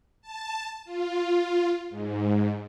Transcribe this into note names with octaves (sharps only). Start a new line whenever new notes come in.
A5
F4
G#2